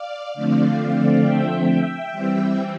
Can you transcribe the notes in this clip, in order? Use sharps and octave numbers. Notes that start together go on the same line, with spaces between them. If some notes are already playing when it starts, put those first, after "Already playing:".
Already playing: D5 F5
D3 F3 A3 C4 D5 F5
E5 G5
E3 G3 C4